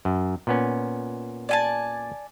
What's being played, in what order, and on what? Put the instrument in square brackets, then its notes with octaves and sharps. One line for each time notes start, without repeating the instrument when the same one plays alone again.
[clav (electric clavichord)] F#2
A#2 B3 C#4
[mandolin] D5 G#5 A5